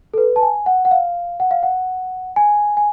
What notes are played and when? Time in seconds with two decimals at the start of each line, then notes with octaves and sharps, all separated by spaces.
0.14 A4
0.18 B4
0.36 A5
0.42 G#5
0.66 F#5
0.85 F#5
0.91 F5
1.40 F#5
1.51 F5
1.63 F#5
2.36 G#5
2.77 G#5